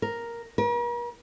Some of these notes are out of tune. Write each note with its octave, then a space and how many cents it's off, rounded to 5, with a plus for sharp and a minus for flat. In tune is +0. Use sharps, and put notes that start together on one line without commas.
A#4 +5
A#4 +45